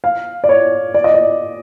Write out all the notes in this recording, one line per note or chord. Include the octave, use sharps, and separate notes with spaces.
F5
D5
C#5
D5
D#5
D5